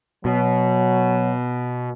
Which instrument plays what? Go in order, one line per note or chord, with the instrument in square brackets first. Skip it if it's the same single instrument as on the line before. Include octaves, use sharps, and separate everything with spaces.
[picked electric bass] B2 [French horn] F#3